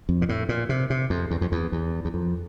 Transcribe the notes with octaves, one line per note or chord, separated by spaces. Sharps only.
F2
A#2
A2
A#2
C3
C3
F2
E2
F2
E2
E2
E2
F2